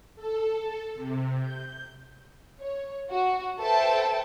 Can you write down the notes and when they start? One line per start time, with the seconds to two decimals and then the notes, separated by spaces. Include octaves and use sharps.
0.16 A4
0.95 C3
1.41 G6
2.60 C#5
3.11 F#4
3.60 A4 B4 C5 E5 G5 A5